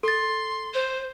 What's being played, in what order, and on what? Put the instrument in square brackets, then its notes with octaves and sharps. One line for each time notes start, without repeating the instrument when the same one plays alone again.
[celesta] A4 A6 [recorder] C6
[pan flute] C5